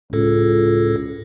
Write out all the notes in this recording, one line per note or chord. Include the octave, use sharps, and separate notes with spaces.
C#2 A2 A4